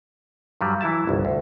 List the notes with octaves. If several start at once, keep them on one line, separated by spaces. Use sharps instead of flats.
G2 F#3 G3
E3 F#3 E4 E5 A5
G1 C2
D2